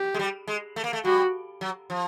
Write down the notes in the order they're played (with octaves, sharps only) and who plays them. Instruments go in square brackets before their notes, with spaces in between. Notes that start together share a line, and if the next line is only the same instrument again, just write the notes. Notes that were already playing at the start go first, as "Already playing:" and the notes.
Already playing: [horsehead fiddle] G4
[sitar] G#3
G3
G#3
A3
A#3
A3
[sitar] G3 [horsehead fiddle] F#4
[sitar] F#3
F3